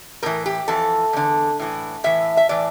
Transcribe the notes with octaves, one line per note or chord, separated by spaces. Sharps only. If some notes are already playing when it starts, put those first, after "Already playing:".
A2 E3 A#4
G4
F2 E3 A4
E2 D3
A2 E3
A2 E3 E5
E5
A2 E3 D5